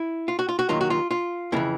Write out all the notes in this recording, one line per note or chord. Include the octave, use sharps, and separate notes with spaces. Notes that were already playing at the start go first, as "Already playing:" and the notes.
Already playing: E4
F4
F#4
F4
F#4
D#2 D#3 F#3 F4
F#4
F4
F4
F2 C#3 E3 E4